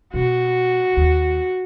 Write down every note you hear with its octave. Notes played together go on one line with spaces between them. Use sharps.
B2 F#4
D#2